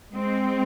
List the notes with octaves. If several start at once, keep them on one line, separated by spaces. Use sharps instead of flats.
G#3 C4